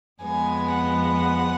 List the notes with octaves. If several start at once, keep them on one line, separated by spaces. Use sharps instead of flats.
F2 F3 G#3 B3 G#5
F#5